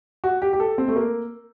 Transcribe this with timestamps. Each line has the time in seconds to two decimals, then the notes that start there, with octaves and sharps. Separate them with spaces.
0.24 F#4
0.42 G4
0.53 G4
0.60 A4
0.78 C4
0.88 A3
0.96 A#3